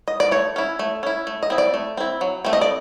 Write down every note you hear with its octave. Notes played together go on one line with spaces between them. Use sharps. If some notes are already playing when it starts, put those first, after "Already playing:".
D#5
D5
A3 C#5
C#4 E4
A3
C#4 E4
A3
D#5
C4 E4
D5
A3
C4 E4
F#3
A3 C4
D#5
D5